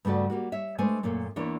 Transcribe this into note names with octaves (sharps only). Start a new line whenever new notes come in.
G2 C#3 A3 F#4 D5
G3 A#3 F#4
C#5 E5
G#3 A3 D4 B4 C5 G#5
F#2 A#2 A3 A#3
E2 E3 A#3 D4 E4 C#5